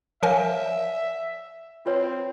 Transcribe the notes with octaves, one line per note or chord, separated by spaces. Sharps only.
F3 A#4 C#5 E5 F5 G#5
C4 F4 B4 C#5